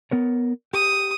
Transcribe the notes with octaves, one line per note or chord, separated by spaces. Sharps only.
B3 A#4 C#5
G4 D#6